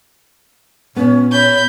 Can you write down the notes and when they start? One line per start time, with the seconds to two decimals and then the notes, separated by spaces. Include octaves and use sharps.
0.96 A#2 B3 C#4
1.32 C#5 B5 G6